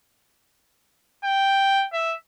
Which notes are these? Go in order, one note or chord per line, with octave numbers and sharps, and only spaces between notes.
G5
E5